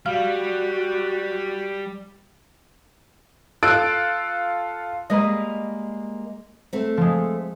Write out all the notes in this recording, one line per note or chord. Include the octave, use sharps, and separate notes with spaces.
G3 F#4 F5 F6
F4 A4 E6 F#6 A6 D7
G3 G#3 A#3 D#5 B5
A3 C4
F3 G#3